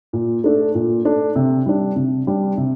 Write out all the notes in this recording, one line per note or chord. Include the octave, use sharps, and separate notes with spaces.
A#2
A3 D4 A4
A#2
A3 D4 A4
C3
G3 D4
C3
G3 D4
C3